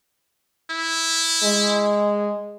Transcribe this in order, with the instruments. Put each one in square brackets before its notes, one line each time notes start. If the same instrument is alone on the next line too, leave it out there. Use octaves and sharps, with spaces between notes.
[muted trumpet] E4
[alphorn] G#3